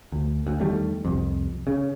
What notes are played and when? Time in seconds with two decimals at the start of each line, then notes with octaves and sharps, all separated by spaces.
0.12 D2
0.47 D2
0.61 E2 D#3 G3 A3
1.05 C2 F2
1.67 C#3